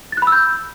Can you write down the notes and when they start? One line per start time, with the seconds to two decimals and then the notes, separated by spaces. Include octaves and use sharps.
0.12 A6
0.17 F#6
0.22 B5
0.27 E6
0.32 G6